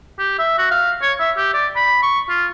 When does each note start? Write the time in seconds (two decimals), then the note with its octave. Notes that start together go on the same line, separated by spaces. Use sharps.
0.19 G4
0.39 E5
0.58 F#4
0.71 F5
1.02 C#5
1.19 E5
1.37 G4
1.54 D5
1.76 B5
2.02 C#6
2.29 F4